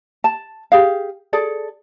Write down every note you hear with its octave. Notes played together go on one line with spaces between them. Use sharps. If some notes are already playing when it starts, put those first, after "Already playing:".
A5
G4 G#4 F5
G#4 A4 D5